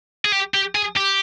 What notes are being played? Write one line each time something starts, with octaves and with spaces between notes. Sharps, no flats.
G#4
G4
G4
G#4
G4